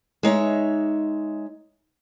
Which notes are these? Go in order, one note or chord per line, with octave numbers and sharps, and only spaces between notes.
G#3 D#4 C#5 E5